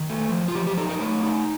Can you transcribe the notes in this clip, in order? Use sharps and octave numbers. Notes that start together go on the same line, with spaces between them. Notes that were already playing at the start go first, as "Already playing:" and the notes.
Already playing: D#3
A3
F3
F4
F3 G4
G4
D#4 A4
A#4
A3 A#4
D#4